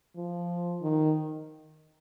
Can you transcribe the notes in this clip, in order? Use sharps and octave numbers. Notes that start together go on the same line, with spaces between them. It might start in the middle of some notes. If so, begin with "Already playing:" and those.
F3
D#3